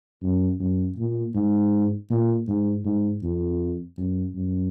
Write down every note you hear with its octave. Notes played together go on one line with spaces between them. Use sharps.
F#2
F#2
A#2
G#2
A#2
G#2
G#2
F2
F#2
F#2